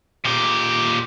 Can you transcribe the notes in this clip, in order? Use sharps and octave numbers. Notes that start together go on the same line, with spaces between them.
A#2 G4